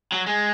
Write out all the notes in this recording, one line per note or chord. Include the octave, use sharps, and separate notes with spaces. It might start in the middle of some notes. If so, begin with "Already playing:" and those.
F#3
G#3